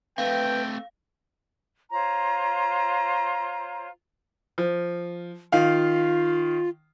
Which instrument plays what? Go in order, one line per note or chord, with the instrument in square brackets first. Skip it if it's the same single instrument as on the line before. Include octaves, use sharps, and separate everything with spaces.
[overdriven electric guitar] A3 C4 [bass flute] B4 [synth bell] F5 [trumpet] G5
[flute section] F4 C5 C#5 A#5
[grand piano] F3
[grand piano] D#3 F5 [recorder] F4